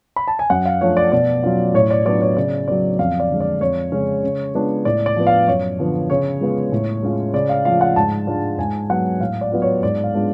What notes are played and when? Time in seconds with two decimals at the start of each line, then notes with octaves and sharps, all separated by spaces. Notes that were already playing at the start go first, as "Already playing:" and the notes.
0.16 B5
0.28 A5
0.39 G#5
0.50 F#2 F#5
0.66 F5
0.81 F3 A3 D4 C#5
0.97 D5
1.12 B2 D5
1.43 F#3 C#4 F4
1.74 A2 C#5
1.90 D5
2.05 F#3 B3 D4 F4 D5
2.21 C#5
2.37 C#3 D5
2.67 F#3 B3 D5
2.99 F2 F5
3.20 D5
3.30 D3 G#3
3.41 D5
3.61 F2 C#5
3.92 C#3 G#3 C#4
4.23 C#3
4.54 G#3 B3 D4 F4
4.85 A2 D5
5.06 D5
5.16 F3 B3
5.27 F5
5.47 F#2 C#5
5.79 D3 F3 B3
6.10 C#3 C#5
6.41 G#3 B3 F4
6.72 A2
7.03 G#3 C#4 F4
7.34 C#3 D5
7.49 F5
7.65 F3 A3 F4 F5
7.81 F#5
7.96 G#2 A5
8.27 G#3 D4 F4
8.59 G#2 G#5
8.90 F#3 B3 F#5
9.21 A2 F5
9.41 D5
9.52 F#3 B3 F4
9.62 C#5
9.83 G#2 D5
10.04 F5
10.14 G#3 B3 D4 F4